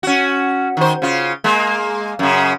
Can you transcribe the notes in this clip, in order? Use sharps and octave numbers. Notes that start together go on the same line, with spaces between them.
C#4 F#4
D#3 C5
C#3 F4
G#3 A#3
F#2 C#3